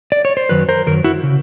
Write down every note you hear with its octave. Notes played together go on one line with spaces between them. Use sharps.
D5
C#5
C5
F#2 D#3 F#3 B4
A#4 C5
F#2 D#3 F#3 A#4
E4 F#4
C#3